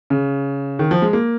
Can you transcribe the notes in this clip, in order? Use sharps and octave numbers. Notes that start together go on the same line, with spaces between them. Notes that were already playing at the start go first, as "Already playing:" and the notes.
C#3
D#3
F3
G#3
A#3